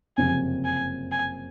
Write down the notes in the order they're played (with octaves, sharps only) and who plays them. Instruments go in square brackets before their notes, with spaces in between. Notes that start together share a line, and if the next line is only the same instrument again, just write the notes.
[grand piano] F#1 F2 C3 [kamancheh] G#5
[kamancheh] G#5
G#5